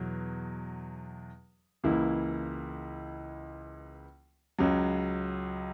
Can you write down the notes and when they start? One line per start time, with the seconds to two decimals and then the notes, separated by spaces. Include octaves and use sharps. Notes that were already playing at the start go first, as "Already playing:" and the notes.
Already playing: E2 B2 F#3
1.83 C#2 C#3 E3 A#3 E4
4.59 C#2 C#3 F#3